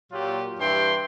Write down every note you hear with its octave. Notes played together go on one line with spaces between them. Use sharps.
A#2 F#3 F4 G4
G2 E3 G5 C6